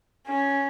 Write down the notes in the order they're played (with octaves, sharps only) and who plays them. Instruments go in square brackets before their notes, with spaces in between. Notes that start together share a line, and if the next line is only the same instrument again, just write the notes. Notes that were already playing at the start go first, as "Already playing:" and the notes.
[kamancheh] C#4